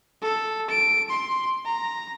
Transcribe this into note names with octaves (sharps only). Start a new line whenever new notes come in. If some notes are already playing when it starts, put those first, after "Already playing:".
A4
D7
C6
A#5